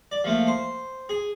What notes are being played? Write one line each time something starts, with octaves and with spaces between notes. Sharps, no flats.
D5
F3 A3 A#3
C5
G#4